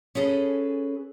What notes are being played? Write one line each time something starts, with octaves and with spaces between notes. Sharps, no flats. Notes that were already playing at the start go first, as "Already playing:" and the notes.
C#4 G#4 A4 B4